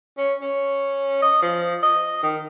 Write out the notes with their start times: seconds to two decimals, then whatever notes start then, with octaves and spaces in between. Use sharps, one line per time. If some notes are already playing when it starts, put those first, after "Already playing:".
0.17 C#4
0.41 C#4
1.22 D#5
1.42 F3
1.83 D#5
2.23 D#3